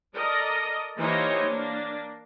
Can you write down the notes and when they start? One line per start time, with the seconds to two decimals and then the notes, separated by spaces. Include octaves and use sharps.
0.14 A4 A#4 D5 D#5
0.97 E3 A#3 D#4 G4 C5 C#5
1.47 A#3 D4